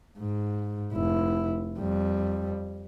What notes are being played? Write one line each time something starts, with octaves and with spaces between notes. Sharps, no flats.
G#2
F1 E4
F2 G3